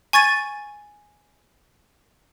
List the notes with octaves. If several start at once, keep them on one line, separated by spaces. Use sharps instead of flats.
G#5 C#6 G#6 A6 D#7